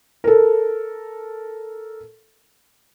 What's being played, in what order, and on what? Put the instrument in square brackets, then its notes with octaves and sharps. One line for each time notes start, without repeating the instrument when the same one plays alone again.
[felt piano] A4 A#4